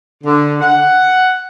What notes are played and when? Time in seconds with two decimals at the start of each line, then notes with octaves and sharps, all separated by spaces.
0.24 D3
0.61 F#5